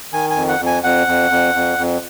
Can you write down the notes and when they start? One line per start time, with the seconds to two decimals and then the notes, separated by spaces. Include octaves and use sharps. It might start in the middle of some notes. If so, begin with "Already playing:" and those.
0.13 D#3 G#5
0.31 G#5
0.36 F2
0.49 F#5
0.60 F2
0.66 G#5
0.84 F2 F#5
1.07 F2
1.31 F2
1.55 F2
1.78 F2